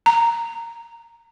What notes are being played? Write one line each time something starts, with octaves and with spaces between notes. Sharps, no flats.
A#5